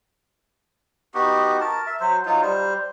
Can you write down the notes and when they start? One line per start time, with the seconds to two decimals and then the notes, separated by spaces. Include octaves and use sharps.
1.14 B3 D#4 F#4 G4
1.60 A#4 A5
1.87 E5
2.00 F#3 C5
2.26 F#3 D#4 F4
2.42 G3 C5